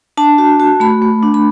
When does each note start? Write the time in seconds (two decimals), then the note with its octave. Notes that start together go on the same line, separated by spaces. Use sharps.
0.17 D4 A5
0.38 F#4
0.60 F#4
0.80 A3 B5
1.02 A3
1.23 D4
1.34 B5